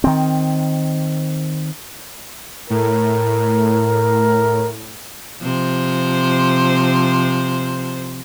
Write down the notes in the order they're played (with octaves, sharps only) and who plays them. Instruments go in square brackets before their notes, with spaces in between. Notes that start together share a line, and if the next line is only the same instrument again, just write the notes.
[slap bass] D#3 C4
[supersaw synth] A2 [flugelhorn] A#4
[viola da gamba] C3 F3 C5